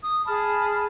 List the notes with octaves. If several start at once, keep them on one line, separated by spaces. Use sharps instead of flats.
D#6
G#4 A5 B5 F6